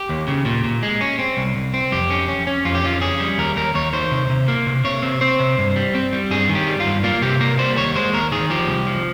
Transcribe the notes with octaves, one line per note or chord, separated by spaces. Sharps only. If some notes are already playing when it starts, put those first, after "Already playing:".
Already playing: G4
D#2
C#3
A#2
A#2
G#3
C#4
C4
C2
C2
C4
F2 G4
C#4
C#4
C#4
F2 F4
G4
C#4 F4
C#4 G#4
G3
D#2 A#4
D#2 A#4
D#2 C#5
D#3 C5
C3
C3
A#3
C3
C3 C#5
C4
C4 C5
C3
G2
G3
C4
G3
G2 G#4
D#3
G4
G3
F4
G2
A#3 F4
C3 G4
A#3 A#4
G3 C5
D#2 C#5
G#3 C5
D#2 A#4
D#3 G#4
F3 G4
C2
F3